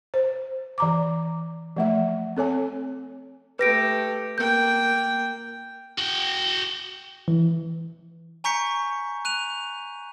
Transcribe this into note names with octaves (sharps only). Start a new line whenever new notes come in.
C5
E3 A#5 D6
F3 A3 E5
C4 A4 C#5 G#5
A3 G4 B4 A#6 D7
A#3 G5 G6
F#4 G5
E3
G#5 A#5 C#6 G6 B6 C#7
F#6 D#7 F7